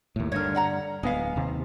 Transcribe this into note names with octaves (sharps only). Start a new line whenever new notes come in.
D#2 A2
G2 D3 A#4 C#5
D5 F#5 A#5
D1 G#3 B3 F5
D#2 C3